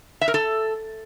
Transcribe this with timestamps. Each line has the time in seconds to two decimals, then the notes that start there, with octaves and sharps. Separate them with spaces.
0.21 E5
0.28 A#4
0.34 A4